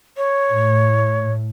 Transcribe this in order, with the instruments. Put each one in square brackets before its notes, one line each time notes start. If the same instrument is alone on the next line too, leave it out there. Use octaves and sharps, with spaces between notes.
[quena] C#5
[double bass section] A2